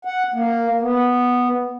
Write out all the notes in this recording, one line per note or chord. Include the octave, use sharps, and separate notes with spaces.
F#5
A#3
B3